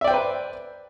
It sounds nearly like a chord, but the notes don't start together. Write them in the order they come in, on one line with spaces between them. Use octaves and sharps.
E5 D5 G5 C5 B4